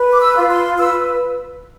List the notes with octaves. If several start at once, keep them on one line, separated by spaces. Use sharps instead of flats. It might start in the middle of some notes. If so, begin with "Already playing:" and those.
Already playing: B4
D6
E6
F4
C6
B4 E6